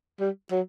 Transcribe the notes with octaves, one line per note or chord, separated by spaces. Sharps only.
G3
F#3